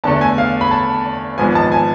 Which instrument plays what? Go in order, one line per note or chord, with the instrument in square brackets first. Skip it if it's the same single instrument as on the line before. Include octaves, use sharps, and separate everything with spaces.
[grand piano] E2 D3 A3 D4 A5
G#5
F5
B5
A5
G#1 G#2 F3 B3 G#5
A5
G#5